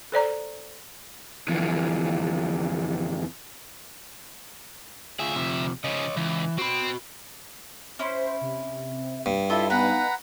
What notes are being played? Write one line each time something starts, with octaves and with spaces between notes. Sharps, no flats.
A4 C5 D5 A#5
F2 D3 E3 F3
D2 F4 G#4 E5
C3 F3
C#3 F3 C#5 D#5
C#2 E3
C4 F#4 B5
C#4 E4 C5
C3
G2
E4 F4 A4 D#5 E5
B3 D#4 B4 F5 F#5 G#5 A#5 B5